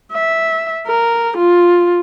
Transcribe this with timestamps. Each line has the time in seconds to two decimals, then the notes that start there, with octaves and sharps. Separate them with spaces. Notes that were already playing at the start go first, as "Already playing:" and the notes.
0.12 E5
0.87 A#4
1.38 F4